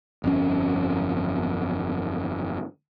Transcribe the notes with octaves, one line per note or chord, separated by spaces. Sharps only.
G1 F2 C#4